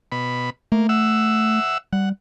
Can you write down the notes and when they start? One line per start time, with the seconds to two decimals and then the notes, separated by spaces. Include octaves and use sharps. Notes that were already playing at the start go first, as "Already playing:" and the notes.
0.12 B2 B5
0.72 A3 A#3
0.89 E5 F#5 E6
1.93 G3 F#5